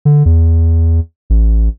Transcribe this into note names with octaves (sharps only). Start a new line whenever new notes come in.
D3
E2
A1